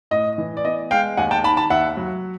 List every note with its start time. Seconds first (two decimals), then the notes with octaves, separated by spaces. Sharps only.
0.11 A2 D#5
0.38 E3
0.57 D5
0.65 B3 D#5
0.91 G#3 F5 G5
1.17 D#2 F#5 G#5
1.31 G5 A5
1.44 D#3 A5 B5
1.57 A5 B5
1.70 D#2 E5 F#5
1.97 F#3